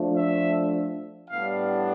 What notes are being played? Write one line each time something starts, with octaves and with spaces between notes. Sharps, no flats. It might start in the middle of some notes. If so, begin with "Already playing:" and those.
Already playing: F3 A3 D4
E5
A2 G3 B3 D4 F5